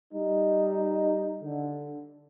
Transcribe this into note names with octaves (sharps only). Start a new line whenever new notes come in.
G3 D#4
D3